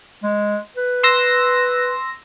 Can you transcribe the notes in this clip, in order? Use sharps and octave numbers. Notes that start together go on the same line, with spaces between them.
G#3
B4
C6 E6 A#6